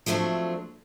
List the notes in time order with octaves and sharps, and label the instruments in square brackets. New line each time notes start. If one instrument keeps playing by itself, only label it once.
[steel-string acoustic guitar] F3 F#3 A3 C4 D4